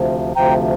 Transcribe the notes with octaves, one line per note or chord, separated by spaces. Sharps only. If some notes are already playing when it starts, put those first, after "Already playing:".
Already playing: D2 C3 F3
D2 C3 F3 G5 A#5